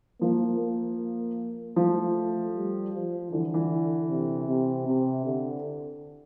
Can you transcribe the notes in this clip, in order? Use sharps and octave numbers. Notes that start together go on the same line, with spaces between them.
F3 A#3
A#3
F3 A3
G3
F3
D3 E3
E3
C3
C3
C3
D3